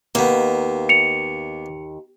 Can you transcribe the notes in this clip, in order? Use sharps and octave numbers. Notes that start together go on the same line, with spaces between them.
D#2 A#3 B3
C#7 F7